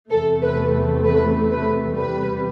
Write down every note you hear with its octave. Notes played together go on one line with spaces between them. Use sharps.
E2 C3 E3 A3 A4
B4
B4
B4
E2 C3 G3 B4